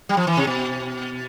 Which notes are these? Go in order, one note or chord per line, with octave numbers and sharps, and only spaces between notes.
G3
F3
E3
C3
B2